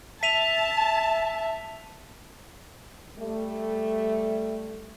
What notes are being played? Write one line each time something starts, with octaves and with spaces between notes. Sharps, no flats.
E5 A5 B6 D#7 F7
G3 A3